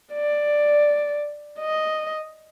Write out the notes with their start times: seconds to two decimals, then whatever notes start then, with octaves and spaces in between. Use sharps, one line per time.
0.13 D5
1.60 D#5